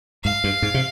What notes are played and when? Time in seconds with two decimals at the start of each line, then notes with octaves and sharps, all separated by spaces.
0.24 G#2 F5
0.44 G2
0.62 G#2
0.74 C3